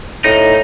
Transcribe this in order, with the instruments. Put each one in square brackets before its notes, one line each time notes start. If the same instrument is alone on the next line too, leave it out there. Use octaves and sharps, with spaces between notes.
[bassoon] A2 [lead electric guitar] D#4